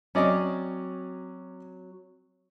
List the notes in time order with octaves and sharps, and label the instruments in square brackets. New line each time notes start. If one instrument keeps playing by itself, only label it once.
[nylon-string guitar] F#3 C4 [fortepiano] C#4 D5 D#5